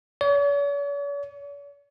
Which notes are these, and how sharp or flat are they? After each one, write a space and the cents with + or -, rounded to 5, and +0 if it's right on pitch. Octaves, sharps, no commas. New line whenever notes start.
C#5 +45